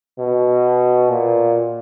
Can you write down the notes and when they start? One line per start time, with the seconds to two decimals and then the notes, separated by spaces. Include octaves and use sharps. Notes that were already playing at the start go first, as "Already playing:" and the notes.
0.19 B2
1.09 A#2